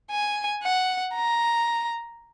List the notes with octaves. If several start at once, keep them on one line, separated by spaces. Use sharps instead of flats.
G#5
F#5
A#5